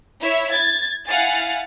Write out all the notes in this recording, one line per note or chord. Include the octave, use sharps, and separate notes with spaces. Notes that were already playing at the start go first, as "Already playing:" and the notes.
E4 C#5 E5
G#6 A6
E4 F5 F#5 G#5 F6 A6